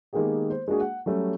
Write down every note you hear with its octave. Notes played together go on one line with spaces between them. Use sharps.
D#3 G#3 A#3 B3 G4 G#4
C5
G#3 A#3 D4 F#4 G#4
F#5
F#3 G3 A3 C#4